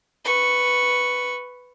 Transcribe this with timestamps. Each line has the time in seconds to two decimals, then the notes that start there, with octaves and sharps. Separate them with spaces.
0.24 B4 C#6